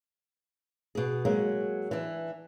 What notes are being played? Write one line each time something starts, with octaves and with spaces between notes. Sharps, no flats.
B2 G#4
F#3 G#3 A#3
E3 D4